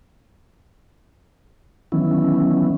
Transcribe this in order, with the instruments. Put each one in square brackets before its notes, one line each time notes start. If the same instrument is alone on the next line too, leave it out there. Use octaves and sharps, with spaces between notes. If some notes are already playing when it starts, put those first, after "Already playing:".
[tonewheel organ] D#3 E3 F#3 B3 C#4 E4